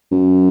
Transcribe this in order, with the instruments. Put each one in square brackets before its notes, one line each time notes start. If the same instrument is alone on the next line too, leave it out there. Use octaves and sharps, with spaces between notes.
[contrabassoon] F#2